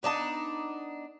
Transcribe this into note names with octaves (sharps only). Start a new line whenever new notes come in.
B3 D4 D#4 A5